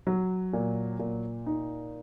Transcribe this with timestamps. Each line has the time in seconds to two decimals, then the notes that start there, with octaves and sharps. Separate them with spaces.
0.07 F#3
0.53 A#2
0.99 A#2
1.46 D#4